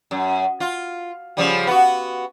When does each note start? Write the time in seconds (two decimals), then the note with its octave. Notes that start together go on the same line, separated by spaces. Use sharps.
0.11 F#2
0.60 F4
1.37 C#3 F3 G3
1.67 B3 F#4